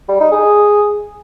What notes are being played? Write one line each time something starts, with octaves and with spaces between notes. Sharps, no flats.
G3
D#4
G#4